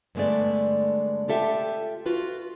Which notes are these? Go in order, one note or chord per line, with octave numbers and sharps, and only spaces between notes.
G2 D3 G#3 A3 B3 D5
F4 G4 A4 E5 F#5 G5
F4 F#4 B4